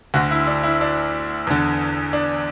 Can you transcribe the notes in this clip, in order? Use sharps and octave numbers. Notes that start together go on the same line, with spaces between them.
D2 D3 F#4
E4
D4
E4
D4
E2 D3
D4